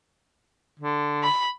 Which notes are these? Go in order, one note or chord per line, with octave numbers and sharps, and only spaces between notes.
D3
B5